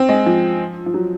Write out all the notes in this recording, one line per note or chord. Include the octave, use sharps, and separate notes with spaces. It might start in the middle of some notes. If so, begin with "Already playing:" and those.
Already playing: C4
G#3
F3
F3
F#3